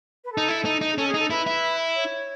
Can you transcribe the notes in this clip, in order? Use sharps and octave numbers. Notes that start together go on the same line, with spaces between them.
B4
D#4 A4
E4
D#4
D#4
G#4
C#4 A4
G#4
D#4
A4
E4 B4
E4
C#5